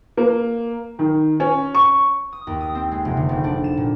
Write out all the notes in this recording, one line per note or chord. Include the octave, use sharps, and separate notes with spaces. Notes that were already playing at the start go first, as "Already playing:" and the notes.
A#3
D#3
C#4
C#6
D#6
D#2
D#6
C4
G#3
F1
D3
G#1
D4
E7
A#2